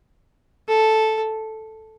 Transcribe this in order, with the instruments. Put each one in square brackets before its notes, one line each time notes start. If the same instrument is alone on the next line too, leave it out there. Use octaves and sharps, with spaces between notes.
[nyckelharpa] A4